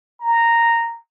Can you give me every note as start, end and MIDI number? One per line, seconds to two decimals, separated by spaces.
0.21 0.98 82